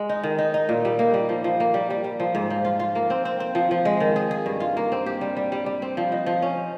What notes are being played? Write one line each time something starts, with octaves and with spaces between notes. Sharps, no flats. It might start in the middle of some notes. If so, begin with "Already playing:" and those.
Already playing: G#3
D#4
D#3
D#4
D#4
A#2
G3
A#3
G3
F3
F3
A#3
G3
G3
G3
F3
G#2
F3
F4
F4
A#3
C4
C4
C4
F3
F3
G#3
D#3
G#4
G#4
G2
F4
A#3
C4
G4
G3
G3
G3
G3
C4
F3
D#4
F3
C#4